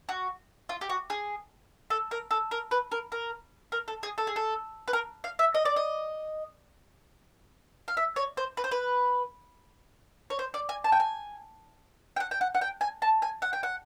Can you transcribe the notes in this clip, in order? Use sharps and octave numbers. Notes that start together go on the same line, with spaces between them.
F#4
F4
G4
F#4
G#4
A4
A#4
A4
A#4
B4
A#4
A#4
A#4
A4
G#4
A4
G#4
A4
B4
A#4
F5
E5
D#5
D5
D#5
F5
E5
C#5
C5
B4
C5
B4
C#5
C5
D5
G#5
A5
G5
G#5
G5
F#5
G5
F#5
F#5
G5
G#5
A5
G#5
F#5
G5
F#5